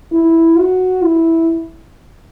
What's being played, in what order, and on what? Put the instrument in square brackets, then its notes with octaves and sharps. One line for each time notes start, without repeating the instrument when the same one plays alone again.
[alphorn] E4
F#4
E4